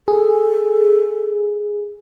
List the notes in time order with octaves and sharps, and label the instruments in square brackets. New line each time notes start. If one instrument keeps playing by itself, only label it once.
[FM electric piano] G#4 [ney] A4